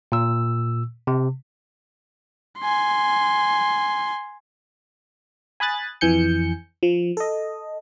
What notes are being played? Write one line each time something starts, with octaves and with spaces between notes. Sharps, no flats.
A#2 E6
C3
G#5 C6
G#5 B5 D#6 F#6 A6
F2 E3 G#5 G6 C#7
F3
A4 D#5